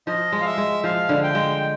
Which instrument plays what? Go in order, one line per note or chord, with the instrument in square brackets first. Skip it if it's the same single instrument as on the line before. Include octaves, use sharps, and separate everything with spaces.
[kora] F3 [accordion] D#5
[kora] G#3
[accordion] F5
E5
[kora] G#3
[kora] F3 [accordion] F5
[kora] D3
[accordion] G5
[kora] G#3